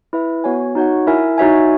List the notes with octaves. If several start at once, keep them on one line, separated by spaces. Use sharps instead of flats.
E4 B4 E5
B3 F#4 C#5 G#5
D#4 F#4 C#5 F#5
E4 A#4 E5 G#5
D#4 F#4 C#5 E5 G#5